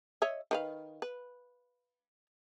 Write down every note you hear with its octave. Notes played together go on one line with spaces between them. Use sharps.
C#5 D#5 E5
D#3 B4 F5
B4